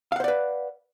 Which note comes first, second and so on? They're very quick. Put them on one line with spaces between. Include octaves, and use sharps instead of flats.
F5 F#5 C5 D5 B4